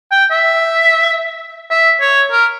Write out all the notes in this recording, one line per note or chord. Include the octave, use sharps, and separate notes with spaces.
G5
E5
E5
C#5
A#4